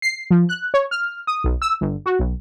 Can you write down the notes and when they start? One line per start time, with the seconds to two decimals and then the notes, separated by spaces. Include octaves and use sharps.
0.02 C7
0.30 F3
0.49 F#6
0.74 C#5
0.91 F6
1.27 D#6
1.44 B1
1.62 E6
1.81 G1
2.06 F#4
2.19 B1